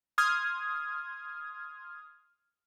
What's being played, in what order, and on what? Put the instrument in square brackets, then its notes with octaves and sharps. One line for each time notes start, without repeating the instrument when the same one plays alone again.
[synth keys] C6 D#6 F6 G#6